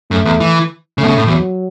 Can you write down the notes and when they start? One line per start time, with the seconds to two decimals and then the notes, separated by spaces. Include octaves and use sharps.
0.11 F#2 A3
0.25 E2
0.40 E3
0.98 C#3 A3
1.04 B2
1.08 C#3
1.18 A2
1.27 E2 F#3